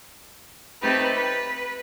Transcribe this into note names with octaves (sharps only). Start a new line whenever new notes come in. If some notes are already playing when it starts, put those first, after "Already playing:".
A3 C4 D#4 G4 B4
B4